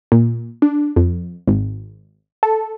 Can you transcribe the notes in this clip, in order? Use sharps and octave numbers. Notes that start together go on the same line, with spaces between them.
A#2
D4
F2
G#1
A4